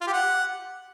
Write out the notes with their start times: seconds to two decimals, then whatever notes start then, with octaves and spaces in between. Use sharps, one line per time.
0.01 F4
0.07 G4
0.13 F#5